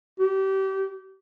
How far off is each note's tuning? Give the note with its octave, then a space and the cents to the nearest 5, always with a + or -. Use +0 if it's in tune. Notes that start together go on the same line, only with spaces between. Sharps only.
G4 -30